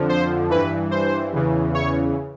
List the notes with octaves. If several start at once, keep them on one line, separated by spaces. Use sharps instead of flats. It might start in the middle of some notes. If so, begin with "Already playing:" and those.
Already playing: F2 D3 F3
C5
G2 E3 B4
C5
E2 C#3 E3
C#5